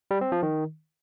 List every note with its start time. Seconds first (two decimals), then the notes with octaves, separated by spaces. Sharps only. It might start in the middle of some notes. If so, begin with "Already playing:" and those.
0.11 G3
0.21 C4
0.32 F3
0.43 D#3